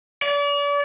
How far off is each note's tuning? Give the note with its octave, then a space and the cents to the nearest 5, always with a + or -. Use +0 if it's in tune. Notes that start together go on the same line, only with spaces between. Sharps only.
D5 -40